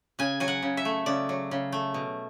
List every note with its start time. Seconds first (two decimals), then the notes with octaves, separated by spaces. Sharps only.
0.19 C#3 G#5
0.40 F#3 G#5
0.48 F#5
0.62 C#3
0.77 E5
0.85 A3
1.06 C#3 D5
1.29 F#3
1.51 C#3
1.72 A3
1.94 B2